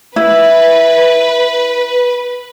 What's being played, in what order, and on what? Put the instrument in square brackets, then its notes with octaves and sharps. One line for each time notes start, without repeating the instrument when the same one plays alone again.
[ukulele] E4 [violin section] B4